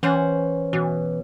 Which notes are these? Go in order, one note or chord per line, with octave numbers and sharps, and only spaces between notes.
E3 C#4 C5 F#5
B2 E3